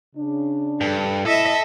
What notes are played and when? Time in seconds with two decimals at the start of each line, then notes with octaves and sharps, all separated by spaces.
0.16 C#3 D4
0.81 G2 A4
1.26 E4 A4 D#5 E5